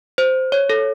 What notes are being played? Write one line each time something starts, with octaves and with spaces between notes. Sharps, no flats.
C5
C#5
A4